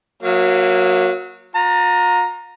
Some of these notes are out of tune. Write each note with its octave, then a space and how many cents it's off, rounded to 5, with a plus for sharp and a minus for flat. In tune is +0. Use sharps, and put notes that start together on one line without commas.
F#3 -15 A#3 +10 E5 +45
F4 +45 A#5 +0